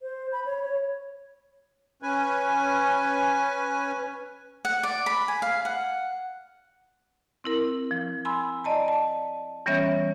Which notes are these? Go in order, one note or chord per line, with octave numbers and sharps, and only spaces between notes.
C5
B5
C#5
C#5
C#4 B4 G#5
F#5
D5
B5
G#5
F5
F#5
C4 E4 A#4
F3
G#5 B5 C6 E6
D5 D#5 A5 A#5
A5
E3 G3 B3 C#4 C#5 E5